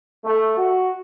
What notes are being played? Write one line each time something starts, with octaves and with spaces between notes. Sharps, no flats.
A3
F#4